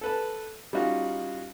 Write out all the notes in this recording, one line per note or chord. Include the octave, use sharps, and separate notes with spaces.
A4 B4 A5
G3 C#4 D#4 F4 F#4